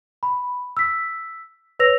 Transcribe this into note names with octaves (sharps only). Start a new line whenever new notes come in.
B5
E6 B6
B4 C#5 E6 A#6 F7